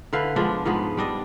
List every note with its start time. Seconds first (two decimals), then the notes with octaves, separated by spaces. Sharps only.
0.13 D3 E4 B4 F5
0.36 F3 G#3 B3 D4
0.65 G#2 F3 B3 G#4
0.97 G3 D4 D#5